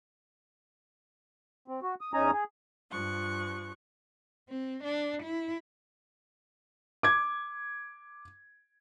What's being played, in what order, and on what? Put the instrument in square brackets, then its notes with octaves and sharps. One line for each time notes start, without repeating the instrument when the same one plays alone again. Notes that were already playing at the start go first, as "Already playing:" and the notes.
[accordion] C4
F#4
D#6
E2 C#4 D#4 G#5 A#5 D#6
G#4
[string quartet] G2 F3 C#6 F#6
[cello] C4
D4
E4
[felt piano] D6 G#6